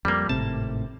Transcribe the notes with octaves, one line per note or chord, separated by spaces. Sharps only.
F2 G3 A#3
G#1 A2 C3 A5